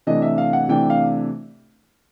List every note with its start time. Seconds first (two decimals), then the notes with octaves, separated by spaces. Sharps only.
0.07 C3 E3 A3 D4 D#5
0.22 E5
0.38 F5
0.53 F#5
0.68 C3 E3 A3 D4 G5
0.90 F5